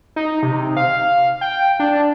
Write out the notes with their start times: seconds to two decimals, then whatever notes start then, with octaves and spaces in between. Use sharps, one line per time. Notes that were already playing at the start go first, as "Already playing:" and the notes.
0.16 D#4
0.43 C3
0.77 F5
1.41 G5
1.80 D4